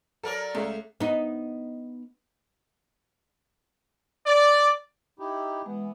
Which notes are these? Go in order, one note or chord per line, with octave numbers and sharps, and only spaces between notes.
F#3 A4 A#4 D5
C#2 A3
B3 D#4
D5
D#4 E4 G4
E3 G#3 B3